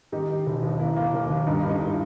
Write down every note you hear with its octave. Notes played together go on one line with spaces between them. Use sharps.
D#3 D#4 G4
D#3
E1
D#2
A#3 E4
A#3
D#2
D#2
G2 D#4
G2
D#4
G2 E4